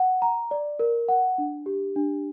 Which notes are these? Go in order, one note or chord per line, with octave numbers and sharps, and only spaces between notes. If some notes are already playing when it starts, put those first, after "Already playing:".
Already playing: F#5
A#5
D5
A#4
F#5
D4
G4
D4